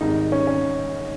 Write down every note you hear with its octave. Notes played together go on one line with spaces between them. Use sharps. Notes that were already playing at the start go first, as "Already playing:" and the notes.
G#1 G#2 D#3 G3 D#4
C#4
C#4